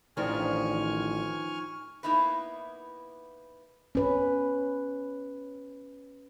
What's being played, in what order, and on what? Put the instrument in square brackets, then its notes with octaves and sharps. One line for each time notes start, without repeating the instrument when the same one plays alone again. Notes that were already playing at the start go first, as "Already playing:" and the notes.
[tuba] A1 [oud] D#3 F3 D4 [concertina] G#5 C#6 F6
[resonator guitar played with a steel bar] A#3 B3 D#4 E4 B4
[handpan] C#4 B4